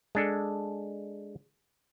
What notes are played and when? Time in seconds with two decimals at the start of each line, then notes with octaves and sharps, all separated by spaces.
0.15 G#3 D4 A4